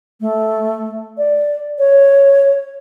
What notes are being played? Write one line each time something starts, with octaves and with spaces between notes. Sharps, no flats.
A3
D5
C#5